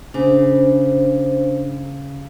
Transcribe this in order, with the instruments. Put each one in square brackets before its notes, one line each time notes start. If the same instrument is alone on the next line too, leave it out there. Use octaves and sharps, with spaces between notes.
[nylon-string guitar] C#3 [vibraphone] D4 C5